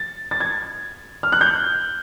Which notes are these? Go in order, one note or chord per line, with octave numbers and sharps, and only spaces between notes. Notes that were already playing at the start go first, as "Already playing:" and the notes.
Already playing: A6
A6
G#6
F6
F#6
G6